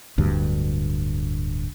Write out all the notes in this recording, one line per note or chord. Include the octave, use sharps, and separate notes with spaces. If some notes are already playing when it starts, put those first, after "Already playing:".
D1 D2 G2